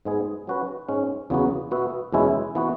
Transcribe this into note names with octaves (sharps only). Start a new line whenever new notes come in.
G#2 G#3 B3 G#4
F#3 C#4 F#4 B4
G#2 G#3 C#4
E2 C#3 F#3 B3 F#4
B2 B3 F#4 B4 E5
E2 B2 G#3 C#4 E4
E3 B3 F#4